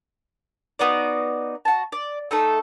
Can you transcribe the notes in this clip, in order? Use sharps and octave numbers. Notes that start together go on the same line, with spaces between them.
B3 D#4 F#4 D5
F#4 A5
D5
A3 D#4 A4